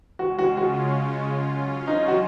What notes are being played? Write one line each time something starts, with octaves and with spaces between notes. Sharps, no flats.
C#3 G#3 C#4 F4 F#4
F#4
F#4
F#3 C#4 F4
D#4
F#4